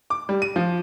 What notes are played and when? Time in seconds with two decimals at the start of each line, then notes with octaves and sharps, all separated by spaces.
0.10 D6
0.29 G3
0.42 D#7
0.56 F3